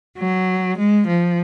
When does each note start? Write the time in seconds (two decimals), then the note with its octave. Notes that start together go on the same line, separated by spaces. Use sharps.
0.16 F#3
0.76 G#3
1.06 F3